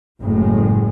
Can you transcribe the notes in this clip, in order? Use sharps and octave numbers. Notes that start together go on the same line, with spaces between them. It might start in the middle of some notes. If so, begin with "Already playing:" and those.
F#1 A2 G#3